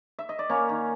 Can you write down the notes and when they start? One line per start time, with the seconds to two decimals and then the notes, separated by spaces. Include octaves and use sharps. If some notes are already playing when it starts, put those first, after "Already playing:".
0.19 E5
0.29 D#5
0.39 D5
0.49 A#3 C#4 C#5
0.69 D#3